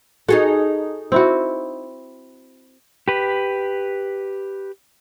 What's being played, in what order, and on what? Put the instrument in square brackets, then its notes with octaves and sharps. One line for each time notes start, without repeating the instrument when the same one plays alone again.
[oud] D#4 G#4 A4 [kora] F#4
[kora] C4 E4 F#4
[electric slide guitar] G4 B4